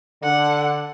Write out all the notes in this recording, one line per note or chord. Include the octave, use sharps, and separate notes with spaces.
D3 F#5